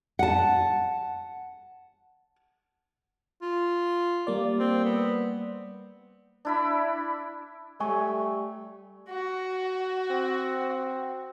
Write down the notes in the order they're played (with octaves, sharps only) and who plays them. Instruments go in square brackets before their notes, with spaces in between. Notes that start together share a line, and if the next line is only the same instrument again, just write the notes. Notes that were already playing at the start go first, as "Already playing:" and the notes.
[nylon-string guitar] F#5 A5
[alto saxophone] F4
[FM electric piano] G3 A#3 D5
[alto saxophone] C4
B3
[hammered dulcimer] D4 E4 B5
[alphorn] G3 [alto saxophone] A3 [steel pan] G#5 [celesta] C#6
[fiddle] F#4
[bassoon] C4